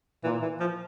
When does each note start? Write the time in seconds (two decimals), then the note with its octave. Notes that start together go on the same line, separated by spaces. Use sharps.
0.24 A#2 E3
0.42 E3
0.60 F3